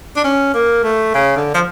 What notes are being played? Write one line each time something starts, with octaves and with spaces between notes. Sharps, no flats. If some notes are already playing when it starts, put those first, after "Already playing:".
D4
C#4
A#3
A3
C#3
D3
F3